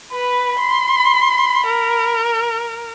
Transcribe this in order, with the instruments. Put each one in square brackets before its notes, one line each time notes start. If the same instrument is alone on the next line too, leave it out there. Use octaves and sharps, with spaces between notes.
[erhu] B4 [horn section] B5
[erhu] C6
A#4